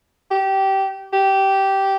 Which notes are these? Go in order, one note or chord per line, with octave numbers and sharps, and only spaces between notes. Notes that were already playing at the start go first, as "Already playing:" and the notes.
G4
G4